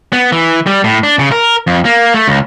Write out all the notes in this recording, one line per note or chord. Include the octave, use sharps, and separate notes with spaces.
B3
E3
G3
A2
D4
C#3
A#4
F2
A#3
A3
C#2